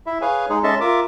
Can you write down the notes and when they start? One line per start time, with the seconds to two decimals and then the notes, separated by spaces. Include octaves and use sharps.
0.06 E4 E5
0.21 G#4 B4 C#5 F5 G#5
0.50 G#3 D#4 G#4
0.63 G#3 C#4 A4 D#5 E5 A5
0.81 F4 A#4 E5 D6